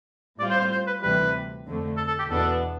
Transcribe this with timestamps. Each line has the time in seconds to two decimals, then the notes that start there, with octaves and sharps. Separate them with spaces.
0.39 A2 G3 C4 F4 D5
0.50 C5
0.61 C5
0.72 C5
0.87 B4
1.02 D2 C3 E3 G3 B4
1.66 F2 D3 A3
1.97 A4
2.08 A4
2.19 G4
2.29 E2 B2 B3 D4 A4